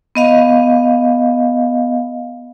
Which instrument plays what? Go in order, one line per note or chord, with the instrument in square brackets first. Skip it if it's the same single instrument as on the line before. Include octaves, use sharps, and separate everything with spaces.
[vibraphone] B3 D#5 F5